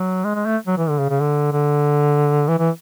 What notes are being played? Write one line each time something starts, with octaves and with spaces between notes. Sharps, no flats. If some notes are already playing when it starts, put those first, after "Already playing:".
Already playing: F#3
G#3
G#3
A3
F#3
E3
D3
C#3
C#3
D3
D3
E3
E3